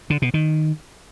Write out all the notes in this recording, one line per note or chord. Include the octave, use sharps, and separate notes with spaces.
D3
B2
D#3